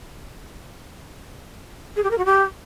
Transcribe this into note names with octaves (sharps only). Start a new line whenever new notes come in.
G#4
G4
A#4
F#4
G4